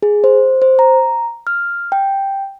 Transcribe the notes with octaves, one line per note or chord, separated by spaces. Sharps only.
G#4
C5
C5
A#5
F6
G5